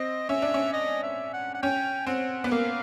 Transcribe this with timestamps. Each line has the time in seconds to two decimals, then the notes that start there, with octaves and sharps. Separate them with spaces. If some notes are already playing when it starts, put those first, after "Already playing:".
Already playing: C4 D#5
0.29 C#4 E5
0.42 D4
0.54 C#4
0.74 D#5
1.03 E5
1.34 F#5
1.54 F#5
1.62 C#4 G5
2.07 C4 F#5
2.44 B3 F#5
2.51 A#3 F5